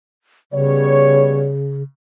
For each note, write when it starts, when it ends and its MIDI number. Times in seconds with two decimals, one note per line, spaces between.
0.52 1.83 49
0.52 1.48 55
0.52 1.48 59
0.52 1.48 73